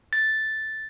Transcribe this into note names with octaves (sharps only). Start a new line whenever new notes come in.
A6